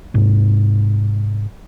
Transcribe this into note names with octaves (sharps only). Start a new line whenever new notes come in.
G#2 C3